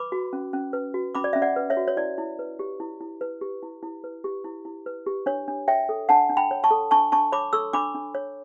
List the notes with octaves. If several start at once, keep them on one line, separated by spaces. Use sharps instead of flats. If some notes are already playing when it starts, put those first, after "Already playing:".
Already playing: B4 B5 D6
F#4
C#4
C#4
B4
F#4
C#4 B5 D6
D5
C#4 E5
D5 F#5
B4
C#5 E5
F#4
C#5
E4 D5
E4
B4
G4
E4
E4
B4
G4
E4
E4
B4
G4
E4
E4
B4
G4
D4 C#5
D4
C#5 E5 G5
A4
D4 F#5 A5
D4
G5 B5
C#5
A5 C#6
A4
D4 A5 C#6
D4 A5 C#6
C#5 B5 D6
A4 C#6 E6
D4 B5 D6
D4
C#5